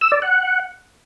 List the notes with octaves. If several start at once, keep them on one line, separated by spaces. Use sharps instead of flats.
E6
D5
F#5